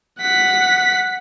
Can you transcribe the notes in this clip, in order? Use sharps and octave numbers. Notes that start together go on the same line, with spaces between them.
F#5 B6